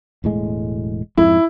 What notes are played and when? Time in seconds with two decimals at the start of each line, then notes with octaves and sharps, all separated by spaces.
0.24 E1 A2 G#3
1.17 F2 G#2 E4